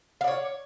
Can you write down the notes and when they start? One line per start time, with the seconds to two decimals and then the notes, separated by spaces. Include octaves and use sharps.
0.21 F5
0.24 D5
0.28 C#5